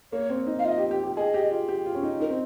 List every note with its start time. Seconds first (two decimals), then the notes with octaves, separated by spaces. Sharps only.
0.12 A#3 C#5
0.29 C4
0.47 D#4
0.59 F5
0.64 F4 D#5
0.78 G4
0.91 G4
1.04 G4
1.16 G#4 D#5
1.34 G4
1.51 F4
1.69 G4
1.86 F4
1.95 C#4
2.03 D#4
2.20 D#4 A#4
2.30 C4